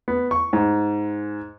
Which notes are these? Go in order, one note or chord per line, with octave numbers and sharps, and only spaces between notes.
B3
C#6
G#2